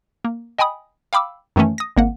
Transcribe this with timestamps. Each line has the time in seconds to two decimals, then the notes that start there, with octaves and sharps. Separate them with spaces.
0.25 A#3
0.59 D#5 G5 G#5 B5 D#6
1.13 F5 G5 B5 D6 E6
1.56 F#2 D#3 E3 A3 C#4
1.78 D#6 A#6
1.97 G#1 A#3 F#5